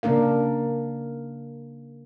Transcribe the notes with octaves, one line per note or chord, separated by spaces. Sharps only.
C#3 A#3 D4 A#4 F5